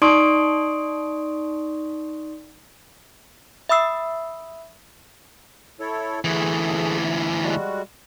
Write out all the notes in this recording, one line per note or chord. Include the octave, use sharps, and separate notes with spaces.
D#4 D5 C6 C#6 D#6 D7
E5 B5 D#6 E6 C7
E4 A4 C#5
D2 E3 A3 G#4
G3 G#3 F#4